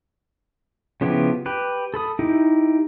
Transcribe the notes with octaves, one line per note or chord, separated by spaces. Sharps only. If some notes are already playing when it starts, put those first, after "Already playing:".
C#3 F3 B3 E4 G4
G4 B4
A4 B5 D#6
D#4 E4 G4